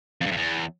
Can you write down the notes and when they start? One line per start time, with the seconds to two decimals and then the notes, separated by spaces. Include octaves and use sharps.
0.21 F2
0.26 G2
0.31 F2
0.37 E2